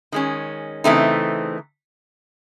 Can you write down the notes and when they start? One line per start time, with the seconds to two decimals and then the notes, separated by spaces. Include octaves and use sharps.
0.12 D#3 G#3 C#4
0.84 C#3 E3 A3 C4 D#4